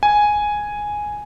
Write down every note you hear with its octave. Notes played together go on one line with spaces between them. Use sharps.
G#5